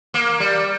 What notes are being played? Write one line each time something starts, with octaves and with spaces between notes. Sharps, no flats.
A#3
G3